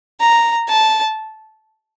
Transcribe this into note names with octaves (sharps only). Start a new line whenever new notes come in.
A#5
A5